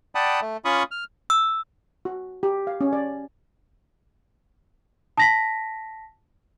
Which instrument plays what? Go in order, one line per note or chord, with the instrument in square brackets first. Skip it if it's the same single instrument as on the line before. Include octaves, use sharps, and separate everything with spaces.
[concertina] D5 F#5 G5 A5 B5 D#6
A3
C#4 F4 B5 C#6 D#6
F6
[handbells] E6
[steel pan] F#4
G4
F5
C#4
D5
[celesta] A5 A#6 B6